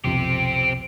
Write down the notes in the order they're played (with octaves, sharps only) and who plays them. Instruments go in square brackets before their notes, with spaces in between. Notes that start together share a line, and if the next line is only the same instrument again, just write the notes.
[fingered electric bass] B1 F2 C3 [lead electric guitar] C4 G4